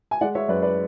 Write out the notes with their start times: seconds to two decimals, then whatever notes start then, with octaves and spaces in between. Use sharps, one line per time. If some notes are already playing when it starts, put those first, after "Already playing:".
0.11 G#5
0.21 G#3 D5 F#5
0.35 C#5 E5
0.48 F#2 B4 D5
0.62 B4 D5